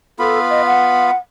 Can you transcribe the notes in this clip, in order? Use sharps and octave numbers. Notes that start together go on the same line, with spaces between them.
B3 F4 A4 B5
D#5
F#5